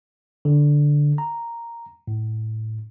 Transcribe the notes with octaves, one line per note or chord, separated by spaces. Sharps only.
D3
A#5
A2